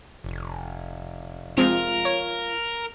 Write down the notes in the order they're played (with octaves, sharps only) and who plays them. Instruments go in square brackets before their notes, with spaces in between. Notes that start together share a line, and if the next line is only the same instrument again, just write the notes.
[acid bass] F1
[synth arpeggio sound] F3 G#3 C4 [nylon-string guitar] F4 [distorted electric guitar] A#4
[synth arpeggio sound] C#5